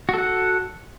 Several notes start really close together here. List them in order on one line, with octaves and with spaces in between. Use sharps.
F#4 A4 F#5